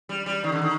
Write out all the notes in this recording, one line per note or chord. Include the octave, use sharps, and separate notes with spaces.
G3
G3
D#3
D3
D#3